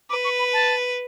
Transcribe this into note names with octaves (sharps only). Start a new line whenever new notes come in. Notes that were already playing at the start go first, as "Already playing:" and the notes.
B4 D6
C#6
B5
A5